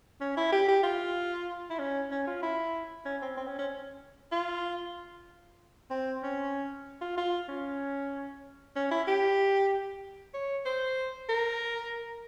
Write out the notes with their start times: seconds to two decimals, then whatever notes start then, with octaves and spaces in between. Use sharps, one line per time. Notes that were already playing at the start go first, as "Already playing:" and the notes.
0.21 C#4
0.37 E4
0.52 G4
0.68 G4
0.83 F4
1.70 E4
1.79 C#4
2.11 C#4
2.27 F4
2.42 E4
3.05 C#4
3.22 C4
3.37 C4
3.47 C#4
3.59 C#4
4.32 F4
5.90 C4
6.23 C#4
7.01 F4
7.17 F4
7.49 C#4
8.76 C#4
8.91 E4
9.08 G4
10.34 C#5
10.65 C5
11.29 A#4